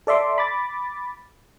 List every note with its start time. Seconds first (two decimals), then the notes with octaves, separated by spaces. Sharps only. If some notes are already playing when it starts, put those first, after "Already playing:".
0.07 A4 D5 E5 C6 D6
0.38 B5 D6 A6